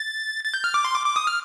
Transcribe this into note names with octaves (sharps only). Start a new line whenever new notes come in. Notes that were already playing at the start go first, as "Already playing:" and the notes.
Already playing: A6
A6
G6
F6
D6
C6
D6
D6
D#6
F6